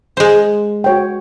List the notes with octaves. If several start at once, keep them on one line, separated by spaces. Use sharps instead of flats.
G#3 C5
F#4 C#5 G5